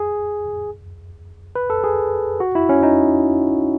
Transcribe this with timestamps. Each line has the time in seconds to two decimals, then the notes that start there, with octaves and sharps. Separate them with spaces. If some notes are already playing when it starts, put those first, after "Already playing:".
Already playing: G#4
1.56 B4
1.70 A4
1.84 G#4
2.40 F#4
2.55 E4
2.69 C#4
2.83 D#4